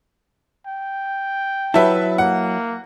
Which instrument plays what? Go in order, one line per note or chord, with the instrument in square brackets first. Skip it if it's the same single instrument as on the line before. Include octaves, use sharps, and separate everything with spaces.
[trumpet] G5
[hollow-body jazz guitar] F#3 E4 [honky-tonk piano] B4 E5 A5
[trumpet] A#3 [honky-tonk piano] F#5